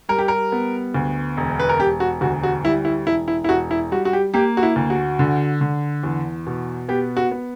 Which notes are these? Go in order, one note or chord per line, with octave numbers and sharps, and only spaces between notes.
G3 A#4
G4
A#4
B3
D2
E1
B4
A#4
E1 G4
F#4
D2 F#4
F#4
G3 E4
E4
E1 E4
E4
E4
E1 F#4
E4
G3 F#4
F#4
G4
A#3 G4
F#4
E4
D2
F#4
D3
D3
E2
B2
B3 G4
F#4
B3